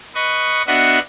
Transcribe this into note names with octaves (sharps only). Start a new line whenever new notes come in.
B4 D#5 C#6
B3 D4 F#4 D#5 E5 F#5